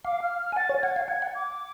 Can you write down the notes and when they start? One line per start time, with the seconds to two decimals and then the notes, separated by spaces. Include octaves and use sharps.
0.05 F5 D6
0.22 F6
0.39 F6
0.52 G#5
0.56 F#5 A6
0.69 C#5
0.82 F#5 G#6
0.96 F5
1.08 F#5 G#6
1.22 F#5
1.35 D6